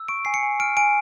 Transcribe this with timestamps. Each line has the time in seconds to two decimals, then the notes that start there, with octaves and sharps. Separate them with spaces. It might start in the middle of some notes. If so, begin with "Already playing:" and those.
Already playing: E6
0.08 C#6 D7
0.25 G#5 C7
0.34 C#7
0.43 G#5
0.60 F6 D7
0.77 G#5 D7